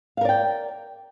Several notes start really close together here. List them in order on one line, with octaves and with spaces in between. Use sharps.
F5 A#4 D5 G5